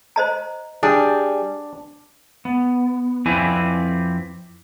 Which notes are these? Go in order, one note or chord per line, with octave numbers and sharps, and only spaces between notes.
C5 D#5 A#5
G3 D4 G#4
B3
F2 C4 E4 B4 D5 G#5